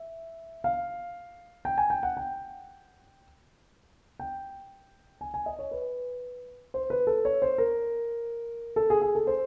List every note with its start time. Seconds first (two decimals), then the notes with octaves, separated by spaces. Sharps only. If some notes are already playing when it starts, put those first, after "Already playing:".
Already playing: E5
0.64 F5
1.65 G5
1.78 G#5
1.90 G5
2.03 F#5
2.17 G5
4.20 G5
5.21 G#5
5.34 G#5
5.46 D#5
5.59 C#5
5.71 B4
6.74 C5
6.90 B4
7.07 A4
7.25 C#5
7.42 C5
7.58 A#4
8.76 A4
8.90 G#4
9.02 G#4
9.15 A4
9.27 C5